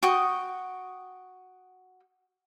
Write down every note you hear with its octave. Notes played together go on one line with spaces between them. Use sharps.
F#4 G5 C#6 D#6